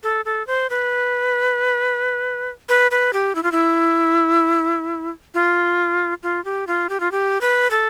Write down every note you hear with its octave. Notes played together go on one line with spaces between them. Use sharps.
A4
A4
C5
B4
B4
B4
G4
E4
F4
E4
F4
F4
G4
F4
G4
F4
G4
B4
A4